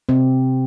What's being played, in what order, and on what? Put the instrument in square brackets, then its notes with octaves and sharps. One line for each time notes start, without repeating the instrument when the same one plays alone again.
[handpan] C3 C4